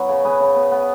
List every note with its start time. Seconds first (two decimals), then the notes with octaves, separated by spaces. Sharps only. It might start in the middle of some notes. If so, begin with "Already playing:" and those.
Already playing: F#3 B3 E4
0.09 C#3
0.24 C#3 G#4 B4
0.40 C#3
0.56 B3
0.72 B3